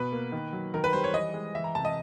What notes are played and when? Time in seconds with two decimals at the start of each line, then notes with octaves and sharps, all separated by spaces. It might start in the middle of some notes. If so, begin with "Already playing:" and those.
Already playing: B2 B4
0.12 A#3
0.32 D#3
0.53 F#3
0.74 D#3 A#4
0.84 B4
0.93 G3 C5
1.04 C#5
1.13 E3 D#5
1.34 G#3
1.55 E3 E5
1.64 A#5
1.75 C3 A5
1.85 D#5